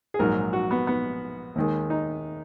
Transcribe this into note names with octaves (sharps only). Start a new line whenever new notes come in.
G#4
A#1 G#2 F#3 A#4
F#4
B3
B3
D#2 D#3 G#3
D#4